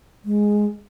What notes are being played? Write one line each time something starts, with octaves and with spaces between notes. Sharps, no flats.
G#3